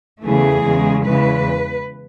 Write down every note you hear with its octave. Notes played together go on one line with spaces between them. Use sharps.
E2 C#3 E3 A3 G#4
E2 C#3 G#3
E2 C#3 E3 G#3 B4